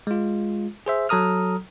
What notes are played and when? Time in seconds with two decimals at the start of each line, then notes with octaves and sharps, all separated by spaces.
0.07 G#3 F4
0.86 G#4 C5 E5
1.09 F#3 A4 A#5 D#6 F6